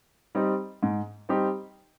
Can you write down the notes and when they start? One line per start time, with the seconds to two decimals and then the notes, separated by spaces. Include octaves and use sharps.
0.35 G3 C4 D#4 G4
0.83 G#2
1.29 G3 C4 D#4 G4